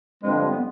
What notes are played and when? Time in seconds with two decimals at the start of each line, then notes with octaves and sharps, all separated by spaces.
0.23 G2 D3 F3 G#3 C4
0.51 B3